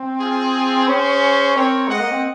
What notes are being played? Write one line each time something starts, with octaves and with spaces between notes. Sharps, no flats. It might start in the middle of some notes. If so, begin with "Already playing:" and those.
Already playing: C4
F4 G#4
C#4 G#4 C5
C4 A#4 C#5
G#3 D#5 F#5
A#3
C4